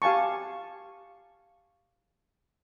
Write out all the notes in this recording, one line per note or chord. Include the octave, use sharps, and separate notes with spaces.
G4 F5 G#5 A5 C#6